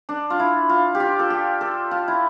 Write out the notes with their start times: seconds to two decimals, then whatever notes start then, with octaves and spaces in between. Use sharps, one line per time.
0.09 D4
0.30 F4
0.39 E4
0.69 F4
0.95 G4
1.00 F4
1.19 A4
1.30 G4
1.61 A4
1.91 F4
2.08 E4